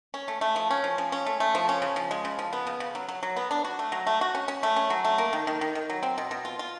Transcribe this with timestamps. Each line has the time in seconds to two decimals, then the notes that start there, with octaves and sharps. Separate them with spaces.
0.14 C#4
0.28 A3
0.41 A3
0.56 F3
0.71 C#4
0.84 F3
0.98 F3
1.12 C#4
1.26 A3
1.40 A3
1.55 F3
1.69 C#4
1.82 C#3
1.96 F3
2.11 G#3
2.25 C#3
2.39 F3
2.53 B3
2.67 C#3
2.80 C#3
2.95 F#3
3.09 F#3
3.23 F#3
3.36 B3
3.51 D4
3.65 F#4
3.79 A3
3.92 F#3
4.07 A3
4.21 F#4
4.35 C#4
4.48 C#4
4.63 A3
4.76 C#4
4.90 F#3
5.05 A3
5.18 A#3
5.33 D#3
5.47 D#3
5.61 D#3
5.75 D#3
5.90 F#3
6.03 C4
6.18 B2
6.31 B2
6.45 F4
6.59 F4